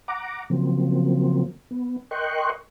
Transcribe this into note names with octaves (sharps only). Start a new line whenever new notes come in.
F#5 A#5 D6
C#3 F3 F#3 A#3 C4
B3
A#4 D#5 G5 C6 C#6 F#6